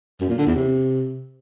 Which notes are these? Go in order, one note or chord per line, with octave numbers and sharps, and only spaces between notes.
F#2
A#2
D3
E2
C3